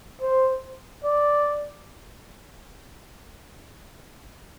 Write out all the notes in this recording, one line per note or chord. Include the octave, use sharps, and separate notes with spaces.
C5
D5